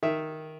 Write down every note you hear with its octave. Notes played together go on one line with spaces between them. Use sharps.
D#3 E5